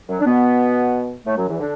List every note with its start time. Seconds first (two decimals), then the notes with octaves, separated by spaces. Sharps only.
0.09 F#2 F#3
0.20 D4
0.25 B2 B3
1.26 A2 A3
1.37 F#2 F#3
1.48 E2 E3
1.60 D3 D4